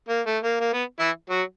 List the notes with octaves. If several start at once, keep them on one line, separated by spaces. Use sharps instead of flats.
A#3
A3
A#3
A#3
B3
E3 E4
F#3 F#4